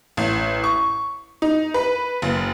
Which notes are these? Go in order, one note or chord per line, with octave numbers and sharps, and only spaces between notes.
A1
C#6
D#4
B4
F#1